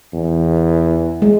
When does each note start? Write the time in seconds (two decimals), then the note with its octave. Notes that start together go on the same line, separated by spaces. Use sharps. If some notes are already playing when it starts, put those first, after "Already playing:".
0.13 E2
1.22 G#3